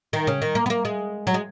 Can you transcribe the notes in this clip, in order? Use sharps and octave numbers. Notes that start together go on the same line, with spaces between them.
D#3
C#3
D#3
A#3
B3
A#3
G#3
F#3
G#3